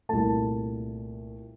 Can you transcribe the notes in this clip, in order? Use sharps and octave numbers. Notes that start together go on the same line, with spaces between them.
C2 A#2 A3 A5